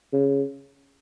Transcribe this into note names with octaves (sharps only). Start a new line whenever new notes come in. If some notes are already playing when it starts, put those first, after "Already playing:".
C#3